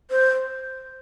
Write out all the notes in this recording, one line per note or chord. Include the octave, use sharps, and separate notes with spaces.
C5